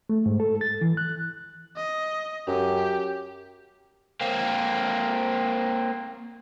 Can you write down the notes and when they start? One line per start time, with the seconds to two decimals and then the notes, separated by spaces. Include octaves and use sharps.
0.09 A3
0.26 G#2
0.40 A4
0.61 A6
0.81 E3
0.97 F#6
1.77 D#5
2.48 F#2 G4
4.21 A#3 C4